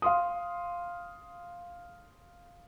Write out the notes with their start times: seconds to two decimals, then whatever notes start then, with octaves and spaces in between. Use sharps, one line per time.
0.02 F5 C6 D#6